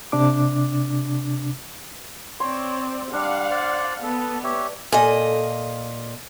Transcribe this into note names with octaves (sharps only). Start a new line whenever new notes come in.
C3 D4 D6
C4 C#5 D5 C6
G3 D4 F5 F#5
C5 D5
B3 A4
G4 C#5 E5
A#2 A4 D#5 G#5